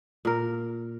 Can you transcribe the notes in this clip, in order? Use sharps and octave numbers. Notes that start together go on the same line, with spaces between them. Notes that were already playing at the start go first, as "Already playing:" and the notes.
A#2 A#4